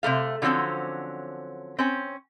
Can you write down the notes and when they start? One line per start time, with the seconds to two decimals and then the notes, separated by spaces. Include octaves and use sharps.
0.03 C3 G#3 A3 F5
0.42 D3 F3 F#3 A#3 C4 C#4
1.78 C4 C#4